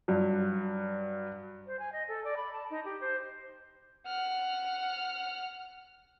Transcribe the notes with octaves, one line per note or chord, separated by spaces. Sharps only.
G2 F#3
C5
G#5
D#5
A4
D5
B5
A5
D#4
G4
C5
F#5 F6